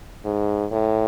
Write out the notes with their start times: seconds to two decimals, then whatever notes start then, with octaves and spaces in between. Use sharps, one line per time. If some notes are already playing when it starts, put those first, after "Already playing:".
0.25 G#2
0.71 A2